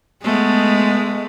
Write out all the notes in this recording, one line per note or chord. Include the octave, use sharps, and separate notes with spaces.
G#3 A3 B3